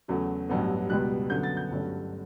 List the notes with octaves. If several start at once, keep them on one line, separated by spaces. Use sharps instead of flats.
E2 C#3 F#3 A3
A1 G2 F#3 B3
C#2 B2 G3 B3 F#6
F#2 D3 F#3 B3 G6
A6
G6
G1 G2 F#3 A3 C#4